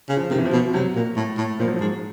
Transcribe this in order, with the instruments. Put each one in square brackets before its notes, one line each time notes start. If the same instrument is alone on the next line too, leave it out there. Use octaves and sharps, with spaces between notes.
[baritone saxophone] C#3
[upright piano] F3
[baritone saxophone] C3 [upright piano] D#3
[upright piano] E3
F3
[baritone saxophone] B2
[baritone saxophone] C3 [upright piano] F#3
[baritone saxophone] A#2
A2
A2
[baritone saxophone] A#2 [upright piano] F3
[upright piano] F#3
F3
[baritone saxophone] G#2